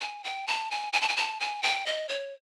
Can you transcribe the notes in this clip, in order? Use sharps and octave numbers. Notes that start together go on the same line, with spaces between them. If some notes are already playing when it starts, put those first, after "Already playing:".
G#5
G5
A5
G#5
G#5
A5
G#5
A5
G#5
G5
D#5
C#5